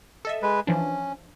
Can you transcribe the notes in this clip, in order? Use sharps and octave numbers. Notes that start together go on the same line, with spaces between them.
A4 D#5 E5
G#3 B4
E3 F3 C#4 D4